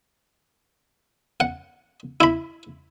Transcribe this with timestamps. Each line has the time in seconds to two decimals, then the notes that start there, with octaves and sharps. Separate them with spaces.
1.40 F#5
2.20 E4 B5